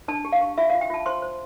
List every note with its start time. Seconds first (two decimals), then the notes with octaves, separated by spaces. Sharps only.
0.08 D4 A5
0.25 G4
0.32 F5
0.41 G4
0.58 F4 E5
0.70 F5
0.74 F4
0.81 G5
0.90 F4 A5
1.06 C5 C6
1.22 C5